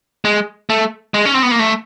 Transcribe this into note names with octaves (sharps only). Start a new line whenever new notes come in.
G#3
A3
G#3
C#4
C4
B3
A#3
A3